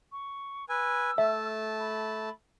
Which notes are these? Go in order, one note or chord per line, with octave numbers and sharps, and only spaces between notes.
C#6
B4 G#5 E6
A3 E5 A5
B5